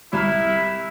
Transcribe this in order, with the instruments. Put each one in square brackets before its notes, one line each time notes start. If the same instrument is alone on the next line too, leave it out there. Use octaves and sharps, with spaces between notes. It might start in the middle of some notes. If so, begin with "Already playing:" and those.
[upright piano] C2 B5 F6 [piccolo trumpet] E4